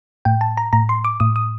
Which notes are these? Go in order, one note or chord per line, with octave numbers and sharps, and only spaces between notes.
A2 G5
A5
A#5
A2 A#5
C6
D6
A2 D#6
D#6